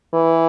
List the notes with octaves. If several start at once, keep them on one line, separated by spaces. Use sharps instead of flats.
E3